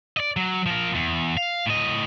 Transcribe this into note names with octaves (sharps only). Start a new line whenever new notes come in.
D5 D#5
F#3
F3 A#4
E2
F5
A2 D#5